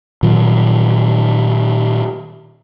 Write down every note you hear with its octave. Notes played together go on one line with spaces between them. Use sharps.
A#2 D#3 F#3